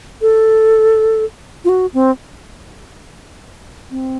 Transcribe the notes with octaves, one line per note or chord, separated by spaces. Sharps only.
A4
F4
F#4
C4
C4